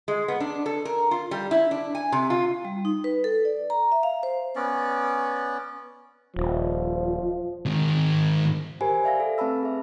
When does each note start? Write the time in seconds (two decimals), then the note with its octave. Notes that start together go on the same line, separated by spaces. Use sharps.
0.08 G#3
0.28 B3
0.40 D4
0.66 A4
0.85 A#4
1.11 F4
1.31 G3
1.51 E4
1.71 D4
1.95 G#5
2.12 C3
2.30 F4
2.65 G3
2.85 D#4
3.04 B4
3.24 A4
3.45 D5
3.70 A#5
3.92 E5
4.03 F5
4.23 C5
4.56 B3 C#4 D5
6.36 D#1 F3
7.66 G#2 D#3
8.81 G4 A#4 C5 G#5 B5
9.04 D5 E5 F5 A#6
9.20 A4
9.38 A3 C4 B4 A5 B5 E6
9.63 G#4 E5